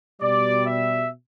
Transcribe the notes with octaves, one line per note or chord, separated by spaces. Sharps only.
B2 G3 D5
E5